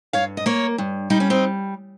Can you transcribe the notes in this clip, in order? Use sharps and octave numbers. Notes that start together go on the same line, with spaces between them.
G2 C#5 F5
D#5
A#3 A#4 C#5
G2
G3 D#4
C#4
C4 D#4